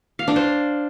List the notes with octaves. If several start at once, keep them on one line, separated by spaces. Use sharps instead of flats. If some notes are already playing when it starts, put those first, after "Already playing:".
F5
D4
C5